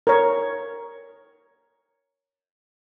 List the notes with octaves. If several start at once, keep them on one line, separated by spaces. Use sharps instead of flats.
A#4 C#5